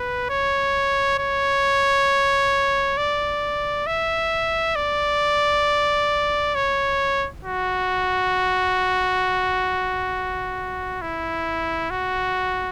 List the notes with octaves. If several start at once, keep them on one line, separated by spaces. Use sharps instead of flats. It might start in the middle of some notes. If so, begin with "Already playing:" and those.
Already playing: B4
C#5
C#5
D5
E5
D5
C#5
F#4
E4
F#4